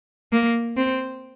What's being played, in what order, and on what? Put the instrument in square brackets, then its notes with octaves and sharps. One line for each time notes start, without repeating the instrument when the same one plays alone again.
[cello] A#3
C4